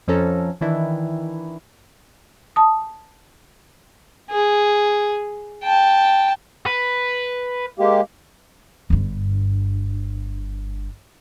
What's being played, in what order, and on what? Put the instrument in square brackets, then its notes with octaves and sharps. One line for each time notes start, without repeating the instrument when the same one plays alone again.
[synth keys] F2 F3 C#4 A4 A#5
D#3 E3 D4 E4
[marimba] A5 D#6
[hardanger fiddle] G#4
G5 A5
[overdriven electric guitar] B4
[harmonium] G#3 A#3 G4
[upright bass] G1 G2